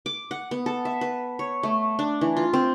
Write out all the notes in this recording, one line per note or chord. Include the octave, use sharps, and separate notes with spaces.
D6
F#5
B3
A4
E5
B4
C#5
A3
D4
E3
F4
C4